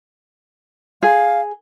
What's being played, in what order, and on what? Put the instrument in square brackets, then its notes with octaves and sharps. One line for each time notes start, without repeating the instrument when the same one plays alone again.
[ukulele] G#4 [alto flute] F5